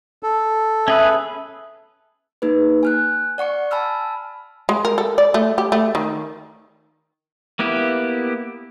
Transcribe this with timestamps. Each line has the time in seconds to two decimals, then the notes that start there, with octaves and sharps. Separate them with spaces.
0.23 A4
0.88 C#4 G#4 B4 E5
2.42 A#3 D#4 G#4 B4
2.83 G#5 F6 F#6
3.38 D5 F#5 C#6 C#7
3.71 G#5 A5 B5 E6 F6
4.69 G#3
4.85 A#4
4.98 A4
5.18 D5
5.34 A3
5.58 G4
5.72 A3
5.95 D#3
7.59 A#3 B3 E4 G4